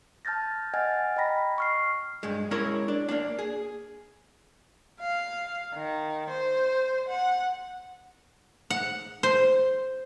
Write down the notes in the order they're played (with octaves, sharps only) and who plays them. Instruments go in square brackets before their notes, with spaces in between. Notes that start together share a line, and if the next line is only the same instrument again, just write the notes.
[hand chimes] A5 F6 G6 A6 A#6
D#5 F#5 G#5 F6 G#6 A6
D#5 G5 A#5 B5 A#6 B6
C#6 F6 C7
[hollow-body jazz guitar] G2 G#3
G#3 C#4 E4 A#4 C#5
D4
A#3 D4
G#4
[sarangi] F5
D#3
C5
F#5
[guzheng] F#5
C5